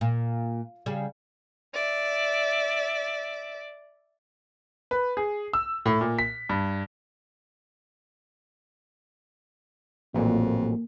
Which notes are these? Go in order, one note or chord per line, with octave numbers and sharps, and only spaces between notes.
A#2
C#3 G3
D5 E5
B4
G#4
E6
A2
A#2
B6
G2
A1 F2 A#2 F#3 A#3